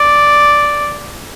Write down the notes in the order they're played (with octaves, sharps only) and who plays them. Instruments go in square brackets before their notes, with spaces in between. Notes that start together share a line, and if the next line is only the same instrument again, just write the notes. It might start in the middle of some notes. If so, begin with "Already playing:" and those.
Already playing: [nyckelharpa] D5